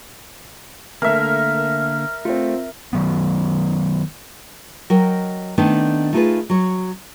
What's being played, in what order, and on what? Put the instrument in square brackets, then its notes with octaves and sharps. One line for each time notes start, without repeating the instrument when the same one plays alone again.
[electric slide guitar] D3 A#3 [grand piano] A3 [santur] A#4 E5 [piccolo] F6
[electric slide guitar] A3 [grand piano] C4 F4
[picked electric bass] D#3 F#3 B3
[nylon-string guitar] F#3 A#4 D#5 G5
D#3 A3 B3 C4 D4 D#4
A3 D#4 F4 G4 G#4 B4
F#3 C#5